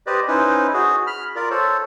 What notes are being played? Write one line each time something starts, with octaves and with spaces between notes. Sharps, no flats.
G4 B4 C5 D5 D#5
C#4 D#4 E4 B4 C5
F#4 G#4
B5 F6
F4 A#4 D5
A4 C5 C#5